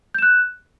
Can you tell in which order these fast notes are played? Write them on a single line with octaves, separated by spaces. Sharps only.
G6 E7 F#6